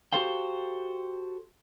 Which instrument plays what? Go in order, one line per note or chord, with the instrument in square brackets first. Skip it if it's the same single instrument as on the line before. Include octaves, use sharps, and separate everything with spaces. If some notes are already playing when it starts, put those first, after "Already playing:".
[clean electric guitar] F#4 G4 A4 C5 F5 G5